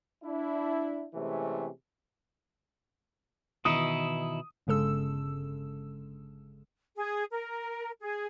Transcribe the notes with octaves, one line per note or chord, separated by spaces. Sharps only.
D4 E4
C3 E3 G#3 A3 C4 C#4
B2 D#3 E3 D#4 E4 D#6
G1 C#3 G#3 A4 E6
G#4
A#4
G#4